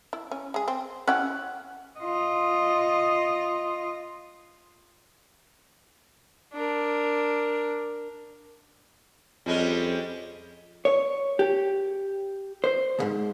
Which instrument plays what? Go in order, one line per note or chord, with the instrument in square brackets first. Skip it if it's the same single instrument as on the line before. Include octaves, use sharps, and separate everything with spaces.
[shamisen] E4
C#4
G#3 G#4
C4
[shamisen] C#4 E4 G4 [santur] F#5
[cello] F4 D#5
[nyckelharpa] D4 A#4
[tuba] F2 [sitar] G3 G#3 C#4
[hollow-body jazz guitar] C#5
G4
C5
C#2 G#2